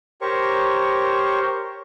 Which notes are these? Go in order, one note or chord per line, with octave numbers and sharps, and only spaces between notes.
G4 A#4 C5 C#5 C#6